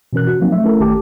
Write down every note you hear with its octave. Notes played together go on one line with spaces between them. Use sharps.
B2 E3 C#4 A#4 F#6
F#4
F3 F#3 A#3 C4 D#4
A3 E5
A3 C#4 E4 A4 A#4
G1 D#3 A3 G4 A5 D6